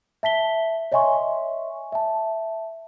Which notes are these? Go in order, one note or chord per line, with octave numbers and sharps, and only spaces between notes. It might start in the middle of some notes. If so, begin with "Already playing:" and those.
E5 A5 B6 G7
C#5 D#5 E5 G#5 C6 C#6
E5 A5